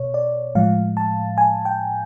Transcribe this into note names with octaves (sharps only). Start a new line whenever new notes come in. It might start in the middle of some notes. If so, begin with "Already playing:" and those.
Already playing: B2 C#5
D5
A2 F3 G#3 F5
A5
G#5
G5